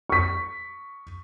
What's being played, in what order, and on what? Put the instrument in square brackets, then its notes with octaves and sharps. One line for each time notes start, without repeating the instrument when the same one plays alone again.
[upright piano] C#6 B6